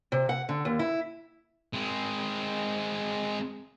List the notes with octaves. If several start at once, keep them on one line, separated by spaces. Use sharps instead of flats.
C3
F#5
D3
D#2
E4
G#3 C4